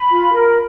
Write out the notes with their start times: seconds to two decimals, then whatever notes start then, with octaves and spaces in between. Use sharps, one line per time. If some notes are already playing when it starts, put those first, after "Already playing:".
Already playing: B5
0.10 F4
0.33 A#4